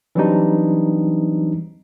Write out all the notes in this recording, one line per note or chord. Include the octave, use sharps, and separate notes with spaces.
E3 F#3 G3 C4 D4 D#4